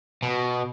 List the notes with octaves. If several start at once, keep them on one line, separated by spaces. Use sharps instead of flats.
B2